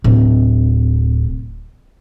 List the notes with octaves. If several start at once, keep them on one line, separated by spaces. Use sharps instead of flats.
D1 C3